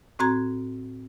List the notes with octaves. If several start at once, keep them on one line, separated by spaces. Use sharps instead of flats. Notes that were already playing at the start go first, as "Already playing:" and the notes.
A2 C4 F#4 A#5 G#6